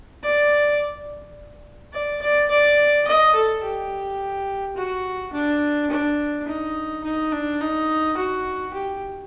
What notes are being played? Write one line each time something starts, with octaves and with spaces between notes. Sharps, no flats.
D5
D5
D5
D5
D#5
A4
G4
F#4
D4
D4
D#4
D#4
D4
D#4
F#4
G4